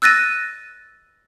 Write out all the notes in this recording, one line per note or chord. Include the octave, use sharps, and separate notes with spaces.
E6 F#6 A6 A#6 D#7